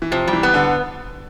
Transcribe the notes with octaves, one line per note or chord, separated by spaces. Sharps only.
E3
C3 F3
G3
E3
B3
D3